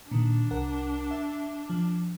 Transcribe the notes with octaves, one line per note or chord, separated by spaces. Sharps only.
A#2 D#3 D4
C2 A#4 F#5
E5
F3